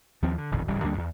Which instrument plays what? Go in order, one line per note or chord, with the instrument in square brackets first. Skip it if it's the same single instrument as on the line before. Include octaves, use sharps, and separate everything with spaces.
[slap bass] D#2 F3 C4
D3
D#1 A1 F2 D#3
D1 G#1 C#3 G3
D2 G3 A#3 D4
E2